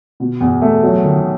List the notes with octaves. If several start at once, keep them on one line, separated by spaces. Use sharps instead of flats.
B2
E2
A3
F#3
D#3